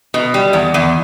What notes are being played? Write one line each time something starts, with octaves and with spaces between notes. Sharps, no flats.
B2
G3
E2
E2